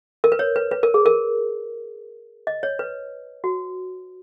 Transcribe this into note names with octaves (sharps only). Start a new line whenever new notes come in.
A#4
B4
C#5
B4
B4
A#4
G#4
A#4
D#5
C#5
B4
F#4